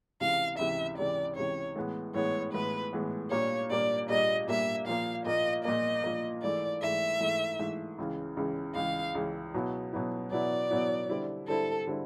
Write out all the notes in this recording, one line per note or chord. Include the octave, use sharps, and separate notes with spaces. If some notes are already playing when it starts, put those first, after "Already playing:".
C#2 C3 E3 F5
C#2 C3 E3 E5
C#2 C3 E3 D5
C#2 C3 E3 C#5
A2 E3 G#3 B3
A2 E3 G#3 B3 C#5
A2 E3 G#3 B3 B4
A2 E3 G#3 B3
A#2 G3 A#3 D4 C#5
A#2 G3 A#3 D4 D5
A#2 G3 A#3 D4 D#5
A#2 G3 A#3 D4 E5
A#2 F3 A#3 F5
A#2 F3 A#3 D#5
A#2 F3 A#3 D#5
A#2 F3 A#3
G#2 E3 A3 D5
G#2 E3 A3 E5
G#2 E3 A3
G#2 E3 A3
C#2 C#3 E3
C#2 C#3 E3
C#2 C#3 E3 F5
C#2 C#3 E3
B2 F#3 B3 E4
B2 F#3 B3 E4
B2 F#3 B3 E4 D5
B2 F#3 B3 E4
D3 G3 C4 E4
D3 G3 C4 E4 A4
D3 G3 C4 E4